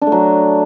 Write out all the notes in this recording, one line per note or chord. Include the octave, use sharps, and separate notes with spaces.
D4
A3
F#3